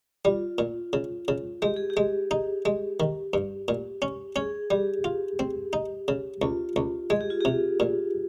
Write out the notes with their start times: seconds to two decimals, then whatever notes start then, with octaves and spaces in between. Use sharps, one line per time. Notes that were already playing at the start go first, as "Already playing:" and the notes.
0.25 G3 F4
0.58 A#2
0.93 C#3
1.28 C#3
1.62 G#3 G4
1.76 G#4
1.90 G4
1.97 G#3
2.31 D#4
2.65 G#3
3.00 D#3
3.34 G2
3.68 A#2
4.02 C#4
4.36 C#4 G#4
4.71 G3 G4
5.04 F4
5.39 C4
5.73 D#4
6.08 C#3
6.42 C#2 F4
6.76 C#2
7.10 G#3 G#4
7.21 G4
7.30 F4
7.41 C3 G4
7.80 A#2